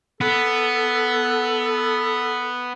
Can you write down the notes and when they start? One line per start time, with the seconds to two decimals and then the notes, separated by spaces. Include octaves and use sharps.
0.21 B3 A4